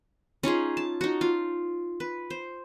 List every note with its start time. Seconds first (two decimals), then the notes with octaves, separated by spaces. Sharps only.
0.43 C#4 D#4 F4 G#4
0.77 A5
1.01 D#4 F#4
1.21 F4
2.00 B4
2.30 C5